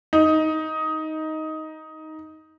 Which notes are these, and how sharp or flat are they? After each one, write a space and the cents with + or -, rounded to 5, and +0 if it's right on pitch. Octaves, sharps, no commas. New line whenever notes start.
D#4 +10